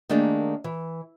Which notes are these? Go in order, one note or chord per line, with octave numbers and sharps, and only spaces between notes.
D#3 A3 A#3 D4 G4 G#4
E3